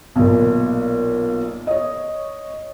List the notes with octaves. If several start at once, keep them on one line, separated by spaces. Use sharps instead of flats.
B1 A#2
C#5 D#5